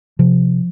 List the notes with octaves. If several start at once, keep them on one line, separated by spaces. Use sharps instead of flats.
C3 F3